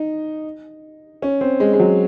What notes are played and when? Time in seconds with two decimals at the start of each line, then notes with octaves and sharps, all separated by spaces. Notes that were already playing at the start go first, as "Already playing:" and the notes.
Already playing: D#4
1.22 C#4
1.41 C4
1.60 G#3
1.73 G#3
1.80 F#3